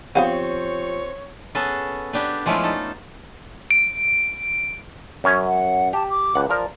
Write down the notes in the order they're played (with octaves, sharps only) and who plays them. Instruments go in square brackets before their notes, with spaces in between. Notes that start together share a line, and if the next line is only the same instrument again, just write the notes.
[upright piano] F3 G4 D#7 [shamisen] B3 F5 F#5 [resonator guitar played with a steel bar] C4 [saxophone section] C#5
[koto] B3 C#4 G#4 A4
B3 D4 G4
F3 G#3 A3 C#4 E4 F4
D#4 A4
[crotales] D7
[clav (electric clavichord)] F#2 C#4 G#5
[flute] F#5
[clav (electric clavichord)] G4 [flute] A5
[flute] D6
[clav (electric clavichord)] C#2 F#5
[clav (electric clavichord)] F3 A#4 [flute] D5